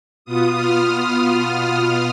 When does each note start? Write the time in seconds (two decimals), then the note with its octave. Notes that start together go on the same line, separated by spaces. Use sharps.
0.25 B2 B3 F4 D#6
0.55 F6
0.86 F6
1.15 D#6
1.46 D#6